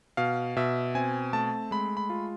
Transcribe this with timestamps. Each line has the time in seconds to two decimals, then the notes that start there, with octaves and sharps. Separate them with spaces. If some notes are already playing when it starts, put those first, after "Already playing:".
0.17 B2 F5
0.56 B2 E5
0.95 C4 G#5
1.33 A3 A5
1.71 G#3 B5
1.97 B5
2.10 F4